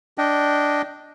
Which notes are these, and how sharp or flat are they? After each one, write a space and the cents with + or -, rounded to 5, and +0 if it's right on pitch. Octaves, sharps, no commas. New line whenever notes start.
D4 +0 D#5 +0 G5 -20